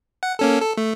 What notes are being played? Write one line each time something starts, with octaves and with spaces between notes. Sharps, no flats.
F#5
A#3 C#4 A4
A4
A3